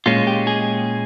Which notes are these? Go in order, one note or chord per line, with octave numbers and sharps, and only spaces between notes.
A#2 G#3 C#4 F4
G4
G#4